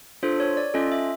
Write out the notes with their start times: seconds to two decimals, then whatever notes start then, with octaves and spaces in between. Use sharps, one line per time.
0.23 D4 F4 A4 C5
0.40 C#5
0.57 D5
0.74 C#4 F4 A4 D#5
0.92 E5